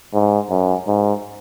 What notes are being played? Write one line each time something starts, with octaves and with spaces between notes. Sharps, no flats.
G#2
F#2
G#2